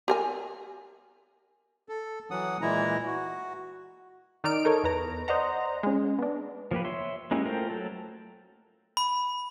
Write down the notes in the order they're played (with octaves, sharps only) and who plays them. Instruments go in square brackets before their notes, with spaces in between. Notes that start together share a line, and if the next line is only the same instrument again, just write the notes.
[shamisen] G4 A#4 G#5
[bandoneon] A4
E3 F#3 F#5 D#6
A#2 E3 G#3 E4 A#5
F#4
[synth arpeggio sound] D#3 D#4 D5 F6 D7
D#4 A4 A#4 C#5
E2 B4 A#5
C5 D5 D#5 F#5 A#5
G#3 C#4
B3 D4
[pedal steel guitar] F3 A#3 G4 B4
C#5 E5 C6
G#3 A#3 C#4 E4 G4
A3 F4 A#4 C5 G5
F#3 A4
[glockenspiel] B5